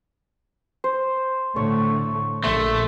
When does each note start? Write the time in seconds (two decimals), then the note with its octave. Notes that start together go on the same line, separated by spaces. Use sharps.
0.84 C5
1.56 A2 D3 A3 C#5
2.44 A#1 A#2 A3 C6